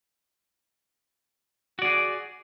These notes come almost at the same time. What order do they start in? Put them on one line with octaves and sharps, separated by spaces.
F#4 D5 G#4